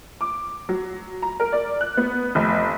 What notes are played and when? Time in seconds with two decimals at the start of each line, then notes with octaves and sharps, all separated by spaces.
0.21 D6
0.69 F#3
1.22 A#5
1.40 A#4
1.52 D5
1.81 F#6
1.97 B3
2.35 F1